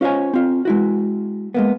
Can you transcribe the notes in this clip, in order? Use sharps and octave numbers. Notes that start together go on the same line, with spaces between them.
C#4 F4 C5 C#5 G#5
C4 F4
G#3 E4 F#4
G#3 A#3 B3